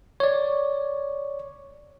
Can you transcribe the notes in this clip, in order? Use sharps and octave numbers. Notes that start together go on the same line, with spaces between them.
C#5 D5